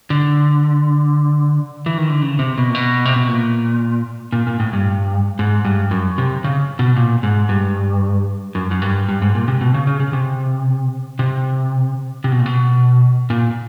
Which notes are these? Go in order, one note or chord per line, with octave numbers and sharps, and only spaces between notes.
D3
E3
D#3
D3
C#3
C3
B2
A#2
B2
C3
B2
A#2
A#2
A#2
A2
G2
G#2
G2
F#2
C3
C#3
B2
A#2
G#2
G2
F#2
F#2
G2
G2
G#2
A#2
C3
B2
C#3
C#3
C#3
C3
C3
C3
B2
A#2
B2
A#2